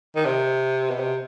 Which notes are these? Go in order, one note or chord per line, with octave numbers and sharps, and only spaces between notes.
D#3
C3
B2
C3